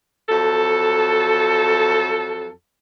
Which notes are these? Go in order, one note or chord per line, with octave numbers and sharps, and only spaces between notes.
F2 F#3 A4